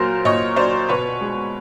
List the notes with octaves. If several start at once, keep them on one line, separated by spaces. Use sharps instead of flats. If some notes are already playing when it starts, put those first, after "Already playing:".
Already playing: A#2 F#3 A#4 C5
A#2 C#5 D#5
F#3 C5 D5
B2 B4 C#5
G#3